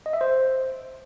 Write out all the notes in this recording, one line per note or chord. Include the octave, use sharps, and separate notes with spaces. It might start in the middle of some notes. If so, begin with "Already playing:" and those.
D#5
E5
C5